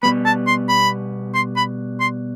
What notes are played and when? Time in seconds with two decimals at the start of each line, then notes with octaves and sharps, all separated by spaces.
0.03 B2 G3 B3 B5
0.25 A5
0.47 C6
0.69 B5
1.34 C6
1.56 B5
2.00 C6